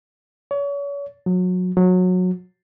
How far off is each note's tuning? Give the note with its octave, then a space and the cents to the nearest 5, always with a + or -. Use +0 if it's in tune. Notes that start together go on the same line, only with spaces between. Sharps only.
C#5 +35
F#3 -25
F#3 -20